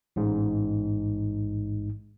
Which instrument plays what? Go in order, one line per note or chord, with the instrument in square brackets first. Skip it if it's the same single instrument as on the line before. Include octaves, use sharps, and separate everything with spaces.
[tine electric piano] A1 G#2